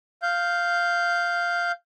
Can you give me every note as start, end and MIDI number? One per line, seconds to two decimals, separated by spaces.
0.22 1.72 77
0.22 1.72 91